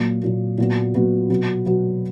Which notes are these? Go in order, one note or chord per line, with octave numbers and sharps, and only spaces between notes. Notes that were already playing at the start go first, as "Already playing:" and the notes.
Already playing: A#2 F#3 A#3
A#2 F#3 A#3
A#2 F#3 B3 F#4
A#2 F#3 B3 F#4
B2 F#3 B3 F#4
B2 F#3 B3 F#4